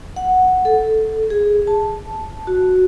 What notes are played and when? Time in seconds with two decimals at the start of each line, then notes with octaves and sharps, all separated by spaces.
0.16 F#5
0.65 A4
1.30 G#4
1.67 A5
2.47 F#4